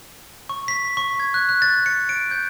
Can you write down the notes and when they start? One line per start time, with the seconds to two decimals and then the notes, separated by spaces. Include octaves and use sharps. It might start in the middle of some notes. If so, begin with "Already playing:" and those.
0.49 C#6
0.68 B6
0.97 C#6
1.20 G#6
1.34 F#6
1.49 F#6
1.62 A6
1.86 C#7
2.09 D7
2.31 G6